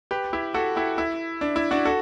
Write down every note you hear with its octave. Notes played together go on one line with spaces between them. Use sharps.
G4 B4
E4 G4
F#4 A4
E4 G4
E4
D4
E4
D4 F#4
F#4 A4